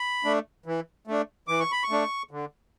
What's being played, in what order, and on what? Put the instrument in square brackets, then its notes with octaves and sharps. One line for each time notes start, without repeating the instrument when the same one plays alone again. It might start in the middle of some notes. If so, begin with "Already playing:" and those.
Already playing: [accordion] B5
A3 D4
E3
A3 D4
E3 D6
C#6
B5
C#6
A3 D4
D3